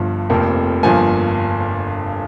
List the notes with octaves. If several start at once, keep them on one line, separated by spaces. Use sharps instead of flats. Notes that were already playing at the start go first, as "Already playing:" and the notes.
Already playing: G1 G2 F3
F1 F2 C3 F3 A#3
G1 G2 F3 A#3 G#5